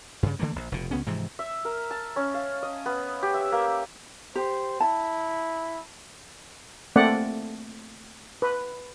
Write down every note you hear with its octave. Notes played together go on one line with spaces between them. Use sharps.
G2 C#3
D3 E3 A3 A#3
A#1
F1 B2
C#2 B3 C#4
G#2 C3 E3 F3
E5
A#4
A5
C#4
F5
D#5
B3
G4
E5
A#3
G4 C5
E4 A5
A3 A#3 C4 D5 F#5
B4